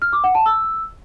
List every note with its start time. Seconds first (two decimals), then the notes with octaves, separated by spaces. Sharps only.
0.02 F6
0.13 D6
0.24 F#5
0.35 A5
0.46 E6